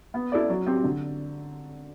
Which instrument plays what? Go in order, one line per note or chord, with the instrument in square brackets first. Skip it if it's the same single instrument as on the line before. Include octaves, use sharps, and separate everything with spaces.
[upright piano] B3
E4 A4 D5
F#3
C4 G4
D3